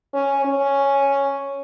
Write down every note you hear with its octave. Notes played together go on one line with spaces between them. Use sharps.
C#4
C#4